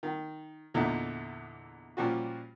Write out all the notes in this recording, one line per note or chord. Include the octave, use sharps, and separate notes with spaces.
D#3
E2 A#2 D3 D#4 E4
A#2 F3 G3 C#4 F#4